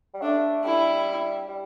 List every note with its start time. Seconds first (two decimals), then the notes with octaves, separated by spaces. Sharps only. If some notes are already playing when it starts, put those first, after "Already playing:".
0.14 G3
0.22 A3 D4
0.64 G3 E4
1.48 G3